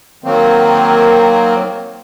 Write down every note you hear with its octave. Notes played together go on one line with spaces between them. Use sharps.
D#3 F#3 A#3 C4